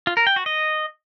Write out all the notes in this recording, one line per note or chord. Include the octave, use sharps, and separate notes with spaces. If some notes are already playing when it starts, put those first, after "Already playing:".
F4
A#4
G5
F#4
D#5